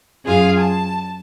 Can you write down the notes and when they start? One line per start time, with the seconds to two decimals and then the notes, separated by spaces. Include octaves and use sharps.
0.25 F#2 F4 G#4 F5
0.59 A5